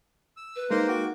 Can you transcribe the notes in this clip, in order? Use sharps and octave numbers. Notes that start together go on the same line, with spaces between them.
E6
B4
G#3 A#3 D#4 C5 A#5 C6
F#4 G5 D6